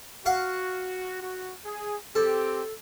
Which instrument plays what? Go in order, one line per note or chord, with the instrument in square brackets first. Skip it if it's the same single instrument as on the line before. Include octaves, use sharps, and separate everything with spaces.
[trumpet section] F#4 [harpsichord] F5 F#5 C#6
[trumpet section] F#4
G#4
[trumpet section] C4 G4 [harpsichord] A4